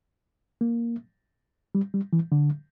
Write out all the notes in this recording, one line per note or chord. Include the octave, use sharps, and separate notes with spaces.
A#3
G3
G3
E3
D3